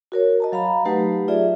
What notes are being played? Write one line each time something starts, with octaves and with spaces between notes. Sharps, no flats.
F#4 A#4 C#5
D#5 A5 A#5
F#3 F5 A#5 B5
F#3 A3 D#4 G4 B4 F#5
F4 G#4 D5 E5